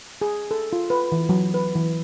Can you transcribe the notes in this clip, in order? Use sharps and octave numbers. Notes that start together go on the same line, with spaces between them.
G#4
A4
F4
B4
E3
F#3
B4
E3